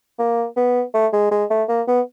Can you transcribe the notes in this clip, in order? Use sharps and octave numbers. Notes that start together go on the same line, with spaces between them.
A#3
B3
A3
G#3
G#3
A3
A#3
B3